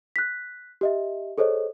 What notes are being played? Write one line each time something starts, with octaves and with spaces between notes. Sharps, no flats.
F#6 B6
G4 D#5 E5
G#4 A4 C5 C#5 D#5